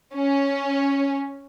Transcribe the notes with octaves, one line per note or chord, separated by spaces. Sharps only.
C#4